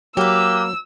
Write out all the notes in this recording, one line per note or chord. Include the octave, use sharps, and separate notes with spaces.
F#3 A#3 G4 B4 E6